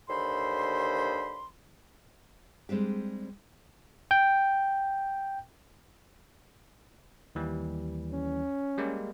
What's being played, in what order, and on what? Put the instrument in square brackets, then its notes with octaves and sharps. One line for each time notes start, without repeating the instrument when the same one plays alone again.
[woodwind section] D#2 D3 C5 B5 C6
[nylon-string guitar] G3 G#3 C4 D4 G4
[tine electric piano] G5 G6
D#2 E3 G3
[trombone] C#4
[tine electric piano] G3 G#3 A#3